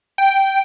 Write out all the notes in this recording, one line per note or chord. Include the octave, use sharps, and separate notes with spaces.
G5